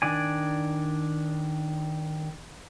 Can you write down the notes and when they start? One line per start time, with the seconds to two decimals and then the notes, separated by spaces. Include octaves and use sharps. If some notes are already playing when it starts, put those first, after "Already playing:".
0.02 D#3 D4 D5 G#5